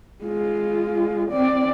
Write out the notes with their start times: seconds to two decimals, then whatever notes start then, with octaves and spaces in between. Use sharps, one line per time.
0.24 G#3 F4
1.31 C4 D5